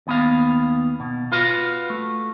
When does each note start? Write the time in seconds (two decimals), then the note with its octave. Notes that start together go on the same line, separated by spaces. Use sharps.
0.07 D#2 B3 F5
1.00 B2
1.32 F4 F#4 B4 F5
1.90 A3